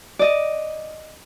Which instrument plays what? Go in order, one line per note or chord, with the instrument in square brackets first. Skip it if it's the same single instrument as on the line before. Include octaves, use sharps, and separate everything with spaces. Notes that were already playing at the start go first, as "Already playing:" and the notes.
[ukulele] D5 D#5